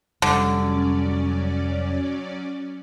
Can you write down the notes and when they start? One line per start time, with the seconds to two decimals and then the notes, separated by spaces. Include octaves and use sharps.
0.22 F1 D3 F#3 G3 C#4 D5